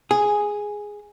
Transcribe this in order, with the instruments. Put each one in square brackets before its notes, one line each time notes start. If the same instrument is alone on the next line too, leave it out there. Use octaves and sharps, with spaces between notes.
[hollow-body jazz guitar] G#4